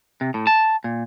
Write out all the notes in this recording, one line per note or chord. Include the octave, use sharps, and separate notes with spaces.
C3
A2
A5
A#2